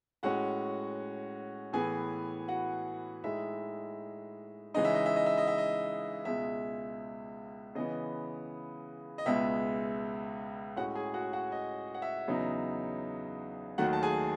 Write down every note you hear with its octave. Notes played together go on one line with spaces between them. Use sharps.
A2 G#3 C#4 F#4 F#5
A2 E3 B3 G#4 G#5
F#4 F#5
A2 G#3 D#4 E5
C#3 E3 G#3 D#4 D#5
E5
D#5
E5
D#5
E5
D#5
E5
D#5
C#2 B2 G#3 E5
C#3 E3 B3 D#5
D#5
C#2 B2 G#3 B3 E5
A2 G#3 C#4 F#4 F#5
G#4 G#5
F#4 F#5
F#4 F#5
D#5
F#5
E5
E2 C#3 F#3 B3 D#4
D#2 D#3 F#3 A3 F#4 F#5
A5
G#4 G#5